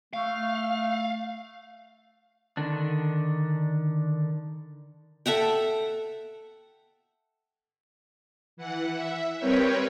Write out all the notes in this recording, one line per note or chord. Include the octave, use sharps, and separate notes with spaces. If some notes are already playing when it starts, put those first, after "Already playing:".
A3 F5
D3 D#3 D4
A4 E5 F#5 G5
E3 F#5
E5
G3 C4 A#4 B4 C#5 G5